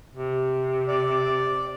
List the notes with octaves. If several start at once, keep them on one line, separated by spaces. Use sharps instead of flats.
C3
D5